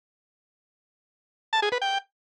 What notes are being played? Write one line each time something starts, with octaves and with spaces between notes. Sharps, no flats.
A5
G#4
B4
G5